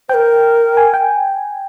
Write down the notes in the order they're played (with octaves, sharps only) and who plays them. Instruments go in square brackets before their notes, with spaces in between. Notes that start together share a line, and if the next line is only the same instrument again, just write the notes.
[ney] A#4 C5 [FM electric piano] G5
[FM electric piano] G#5
G5